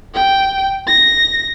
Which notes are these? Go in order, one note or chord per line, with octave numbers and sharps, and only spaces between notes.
G5
A#6